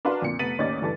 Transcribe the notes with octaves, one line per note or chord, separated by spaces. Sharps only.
D4 F#4 A#4 B4 F5 C6
F2 A#2 C#7
F1 B3 A6 B6 D#7 F#7
A1 D#2 C#4 D#4 D5 A6
G2 E3 A4 D5 A6